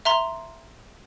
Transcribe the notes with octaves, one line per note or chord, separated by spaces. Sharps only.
E5 A#5 C6